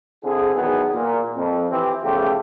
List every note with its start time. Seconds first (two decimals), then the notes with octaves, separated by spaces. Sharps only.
0.24 D3 C4 E4 G#4
0.54 E2 D#3 F#3 B3 G#4
0.93 A#2
1.35 F2
1.70 E3 C4 G4
2.03 E2 C#3 F3 A3 F4 G4